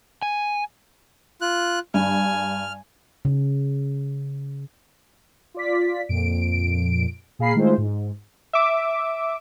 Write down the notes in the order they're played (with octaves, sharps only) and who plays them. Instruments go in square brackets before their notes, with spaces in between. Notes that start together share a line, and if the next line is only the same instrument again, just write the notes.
[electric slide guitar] G#5
[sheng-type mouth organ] F4 F#6
[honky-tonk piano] G2 [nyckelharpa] G#5 [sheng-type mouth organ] F6
[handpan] C#3
[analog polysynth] F4 D5 B6
F2 A#2 D7
A#2 G#4 F5 A#5 B5 C7
D#3 G#3 A3 E4 F4 C5
G#2
[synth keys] E5 D6